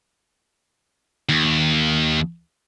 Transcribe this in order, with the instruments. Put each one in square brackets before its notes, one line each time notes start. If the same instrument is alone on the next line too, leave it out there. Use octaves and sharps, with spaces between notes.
[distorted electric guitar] D#2